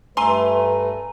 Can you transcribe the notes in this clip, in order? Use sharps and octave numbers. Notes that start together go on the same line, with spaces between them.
G2 A3 B4 G#5 A#5 C6 D#7